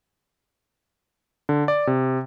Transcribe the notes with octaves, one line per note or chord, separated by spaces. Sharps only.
D3
D5
C3